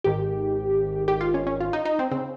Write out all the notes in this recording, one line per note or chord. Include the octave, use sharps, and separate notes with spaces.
G#1 G#2 D#3 G4
G4
F4
C#4
C#4
F4
D#4
D#4
C4
C#3 C4